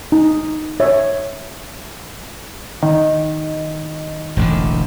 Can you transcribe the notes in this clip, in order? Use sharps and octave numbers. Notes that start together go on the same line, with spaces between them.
D#4
C#5 E5
D#3
E1 A1 D3